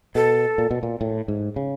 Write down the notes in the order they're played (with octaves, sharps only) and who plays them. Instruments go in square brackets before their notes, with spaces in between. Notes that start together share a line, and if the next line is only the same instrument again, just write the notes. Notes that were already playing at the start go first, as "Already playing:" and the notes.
[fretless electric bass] B2 [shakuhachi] A4
[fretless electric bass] A#2
B2
A#2
A2
G#2
C#3